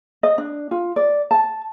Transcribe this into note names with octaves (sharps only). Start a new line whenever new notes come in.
D#5
D4
F4
D5
A5